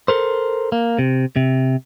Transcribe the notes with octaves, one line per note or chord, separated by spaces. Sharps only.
A4 A#4 C5
A#3
C3
C3